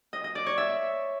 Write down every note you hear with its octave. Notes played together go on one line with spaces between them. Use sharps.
D#5
D#5
D5
C#5
E5